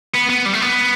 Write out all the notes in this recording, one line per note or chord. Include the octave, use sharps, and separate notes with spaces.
B3
B3
G3
A3
B3